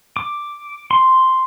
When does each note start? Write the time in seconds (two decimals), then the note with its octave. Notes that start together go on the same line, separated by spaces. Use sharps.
0.17 D6
0.91 C6